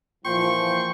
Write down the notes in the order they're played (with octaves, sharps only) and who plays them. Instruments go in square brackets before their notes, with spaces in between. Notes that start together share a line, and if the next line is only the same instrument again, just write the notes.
[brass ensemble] A#2 E3 F3 [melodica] G5 C6 [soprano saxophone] C#6